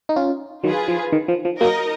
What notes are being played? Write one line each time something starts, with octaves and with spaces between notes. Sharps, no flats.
D#4
C#4 F4
D#3 F#3 F4 G#4 B4
F3
D#3
F3
F3
F#3 A#3 D#4 A#4 D#5